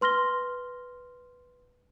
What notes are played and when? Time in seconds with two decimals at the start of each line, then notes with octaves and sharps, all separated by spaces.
0.01 B4 C6 F6 A#6 G7